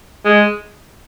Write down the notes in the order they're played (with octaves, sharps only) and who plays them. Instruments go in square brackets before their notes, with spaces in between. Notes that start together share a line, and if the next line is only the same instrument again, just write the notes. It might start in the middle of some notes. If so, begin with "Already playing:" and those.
[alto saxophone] G#3